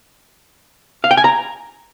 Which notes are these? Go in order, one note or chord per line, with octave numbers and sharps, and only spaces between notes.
F5
G5
G#5
A#5